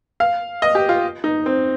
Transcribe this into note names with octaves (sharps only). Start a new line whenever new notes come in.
F5
D#5
G4
F4
D#4
C4